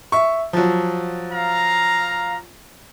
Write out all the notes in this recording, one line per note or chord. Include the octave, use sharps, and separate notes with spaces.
E5 C#6
F3 F#3
F5 A#5